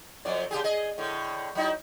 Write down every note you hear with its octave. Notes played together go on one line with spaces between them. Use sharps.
F2 F#3 D5
C#3 G4 G#4
G#4 D#5
A2 D3
F#3 D#4 E4